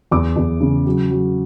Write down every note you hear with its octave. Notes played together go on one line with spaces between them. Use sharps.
E2 D6
E2
C#3
F#3
F#3